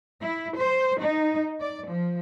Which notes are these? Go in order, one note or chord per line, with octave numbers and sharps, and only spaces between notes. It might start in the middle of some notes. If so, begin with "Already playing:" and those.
E4
C5
D#4
D5
F3